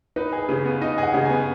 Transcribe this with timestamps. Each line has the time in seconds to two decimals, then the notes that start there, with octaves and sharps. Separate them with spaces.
0.16 D#4 B4
0.33 G#4
0.49 C#3
0.65 B3
0.81 D#4 D#5
0.98 G#4
1.03 F#5
1.14 C#3
1.25 B3 G#5